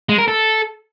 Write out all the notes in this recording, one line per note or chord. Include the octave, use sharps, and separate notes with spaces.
G#3
A#4
A4